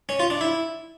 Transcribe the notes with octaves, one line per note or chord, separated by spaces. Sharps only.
C#4
F4
D4
E4